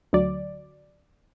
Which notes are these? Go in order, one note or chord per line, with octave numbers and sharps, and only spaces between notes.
D2 F#3 D5